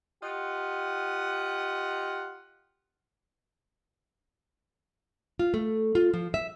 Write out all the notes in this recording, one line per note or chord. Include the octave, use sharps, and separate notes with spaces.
F4 G4 D#5 F#5
F4
A3
F4
F3
E5